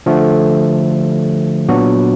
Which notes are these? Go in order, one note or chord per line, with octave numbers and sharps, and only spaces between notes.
D3 F3 A3
A#2 F#3 B3 D4 F#4